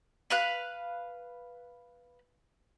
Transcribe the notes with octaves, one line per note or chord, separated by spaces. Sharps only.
B4 F5 F#6